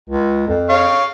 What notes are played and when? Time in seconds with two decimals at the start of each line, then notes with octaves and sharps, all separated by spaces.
0.10 C#2
0.48 F2
0.69 C#5 F5